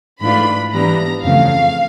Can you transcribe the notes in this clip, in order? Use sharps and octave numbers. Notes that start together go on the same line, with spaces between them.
G#2 E3 A3 D4 F4 B5
G#2 E3 G3 B3 D4 A#5
F2 C#3 E3 A3 F5